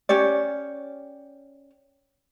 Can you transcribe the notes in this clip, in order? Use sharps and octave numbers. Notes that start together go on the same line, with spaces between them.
C#4 G4 C#5 D5